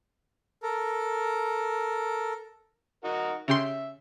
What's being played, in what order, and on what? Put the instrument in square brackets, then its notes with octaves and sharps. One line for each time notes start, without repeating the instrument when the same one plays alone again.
[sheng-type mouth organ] A4 A#4
[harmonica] D#4 F#4 A#4
[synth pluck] C#3 G4 C6 [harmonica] E5